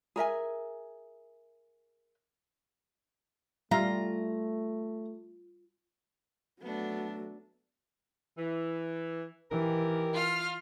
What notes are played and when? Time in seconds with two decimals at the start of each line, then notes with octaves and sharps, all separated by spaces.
0.16 G#4 A#4 E5 G#5
3.71 G3 A3 F4 E5 F5 A#5
6.61 F#3 A3 B3 D4
8.37 E3
9.51 D#3 E3 G4 A#4
10.13 F4 F6